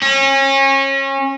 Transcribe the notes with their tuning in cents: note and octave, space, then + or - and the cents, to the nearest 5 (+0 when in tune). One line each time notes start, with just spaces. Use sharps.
C#4 -30